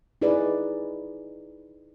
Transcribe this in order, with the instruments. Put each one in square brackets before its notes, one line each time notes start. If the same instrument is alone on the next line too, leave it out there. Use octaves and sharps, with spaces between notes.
[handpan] D#4 E4 G#4 B4 D5